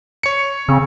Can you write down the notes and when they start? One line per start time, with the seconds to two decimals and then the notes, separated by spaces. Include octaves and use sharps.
0.23 C#5 C#7
0.69 C#3 C4